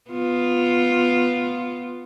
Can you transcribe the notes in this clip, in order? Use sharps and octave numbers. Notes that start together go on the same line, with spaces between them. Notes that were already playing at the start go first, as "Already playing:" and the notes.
B3 F4